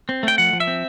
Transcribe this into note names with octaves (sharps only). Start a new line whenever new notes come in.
C4
A3 G5
F3 F#5
F3
E5
C4